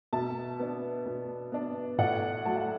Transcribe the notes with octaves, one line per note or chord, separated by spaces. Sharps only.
B2 E5 A5
B3 D4
B2
B3 D4
A2 D5 F#5
F#3 A3 A5
F#5